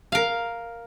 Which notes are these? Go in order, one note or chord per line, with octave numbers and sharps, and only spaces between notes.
A#4 F5